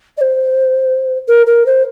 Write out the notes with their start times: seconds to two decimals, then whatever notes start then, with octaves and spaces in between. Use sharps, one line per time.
0.17 D5
0.21 C5
1.28 A#4
1.46 A#4
1.66 C5